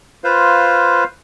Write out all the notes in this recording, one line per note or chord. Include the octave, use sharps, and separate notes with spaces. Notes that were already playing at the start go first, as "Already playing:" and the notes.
F4 B4 C5 F5